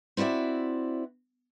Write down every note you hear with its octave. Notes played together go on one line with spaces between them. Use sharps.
C4 E4 F#4 D5 E5